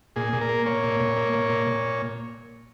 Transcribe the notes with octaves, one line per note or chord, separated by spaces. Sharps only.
A#2 G#4
A#2
A#4
A#3
A#3 C#5
A#2
A#2
A#3
A#3
A#2
A#2